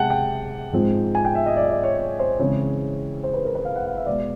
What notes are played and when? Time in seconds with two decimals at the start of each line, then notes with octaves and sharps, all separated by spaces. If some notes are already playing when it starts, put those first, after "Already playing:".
Already playing: C3 G#3 F#5 G5 A5
0.10 G5
0.72 G#2 F3 G#3 C4
1.15 G#5
1.25 G5
1.35 E5
1.46 D#5
1.56 D5
1.64 D#5
1.70 D5
1.84 C#5
1.98 C#5
2.19 C5
2.39 C#3 E3 G#3 C4 C#5
3.23 C5
3.34 B4
3.44 A#4
3.55 B4
3.65 F5
3.76 F#5
3.86 F5
3.96 E5
4.06 B2 G#3 D5